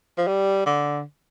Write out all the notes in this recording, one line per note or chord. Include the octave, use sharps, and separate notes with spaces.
F3
G3
D3